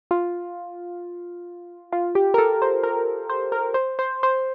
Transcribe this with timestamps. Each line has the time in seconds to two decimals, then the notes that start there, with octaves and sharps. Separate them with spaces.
0.11 F4
1.92 F4
2.15 G4
2.34 A#4
2.38 A4
2.62 C5
2.83 A#4
3.30 C5
3.52 A#4
3.74 C5
3.99 C5
4.23 C5